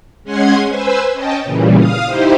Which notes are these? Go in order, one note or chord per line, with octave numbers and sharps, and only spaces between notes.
G#3 C#4 F#5 G#5 C6 G#6
B4 C5 G#5 E6
C#4 D#5 G5 A5
A#2 C#3 E3 G3
F5 D#6 F6
D#4 E4 G4 C5